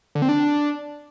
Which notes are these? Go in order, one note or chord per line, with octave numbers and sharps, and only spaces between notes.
D3
C4
D4